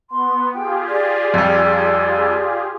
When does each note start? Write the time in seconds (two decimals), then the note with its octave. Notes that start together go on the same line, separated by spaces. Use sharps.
0.10 B3 C6
0.53 F4 G4 G#4 G5
0.88 D5
1.34 F2 G3